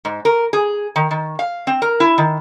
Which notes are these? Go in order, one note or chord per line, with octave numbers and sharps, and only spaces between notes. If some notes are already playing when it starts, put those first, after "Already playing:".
G#2
A#4
G#4
D#3
D#3
F5
C4
A#4
E4
D#3